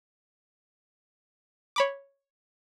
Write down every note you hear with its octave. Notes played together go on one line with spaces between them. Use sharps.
C#5 B5 D6